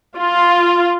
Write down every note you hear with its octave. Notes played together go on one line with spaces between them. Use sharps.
F4